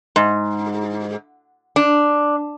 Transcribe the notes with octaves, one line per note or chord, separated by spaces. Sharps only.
G#2
D4